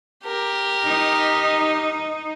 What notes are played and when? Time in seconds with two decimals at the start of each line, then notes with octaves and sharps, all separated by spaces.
0.24 G4 A#4
0.86 D#4